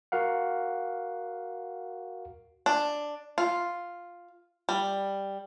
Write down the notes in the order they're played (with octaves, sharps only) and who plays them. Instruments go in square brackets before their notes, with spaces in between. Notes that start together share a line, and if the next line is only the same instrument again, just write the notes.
[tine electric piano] F#4 A#4 F5 F#5
[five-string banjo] D4
F4
G3